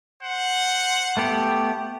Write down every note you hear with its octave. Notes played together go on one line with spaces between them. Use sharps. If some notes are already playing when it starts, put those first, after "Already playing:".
C5 F#5
A3 B3 G4